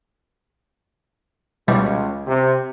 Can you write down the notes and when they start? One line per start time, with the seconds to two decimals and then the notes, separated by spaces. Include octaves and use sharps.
1.68 C#2 B2 E3 G3
2.27 C3